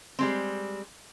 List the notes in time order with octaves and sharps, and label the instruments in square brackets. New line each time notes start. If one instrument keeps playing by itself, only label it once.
[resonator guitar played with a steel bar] G3 G#3 C4